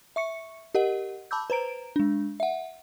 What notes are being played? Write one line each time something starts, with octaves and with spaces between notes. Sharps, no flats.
E5 C#6 C#7
G4 A#4 D#5 F#5
A5 B5 D6 E6 G6
B4 C5 A#5 D7
G#3 D4
E5 F#5